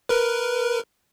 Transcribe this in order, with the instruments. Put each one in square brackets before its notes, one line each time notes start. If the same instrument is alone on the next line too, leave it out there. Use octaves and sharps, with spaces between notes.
[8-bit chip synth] A#4 B4